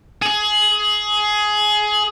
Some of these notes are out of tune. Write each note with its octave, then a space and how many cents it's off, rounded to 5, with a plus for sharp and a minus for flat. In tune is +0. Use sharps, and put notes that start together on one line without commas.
G#4 +20